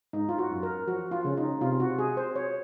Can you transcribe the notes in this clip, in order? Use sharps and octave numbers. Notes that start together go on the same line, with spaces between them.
G#2 D#4
F4
F#4
F#2
A#4
F3 F#4
F4
C#3 C#4
D#4
C3 F4
F#4
G#4
C5
C#5